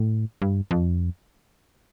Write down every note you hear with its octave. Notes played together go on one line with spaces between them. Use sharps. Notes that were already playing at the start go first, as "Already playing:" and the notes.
Already playing: A2
G2
F2